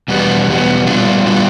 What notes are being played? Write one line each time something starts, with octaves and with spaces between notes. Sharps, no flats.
E2 B2 G3 B3
E2 B2 G3 B3
A#2 G3 B3 D4 F4
A#2 G3 B3 D4 F4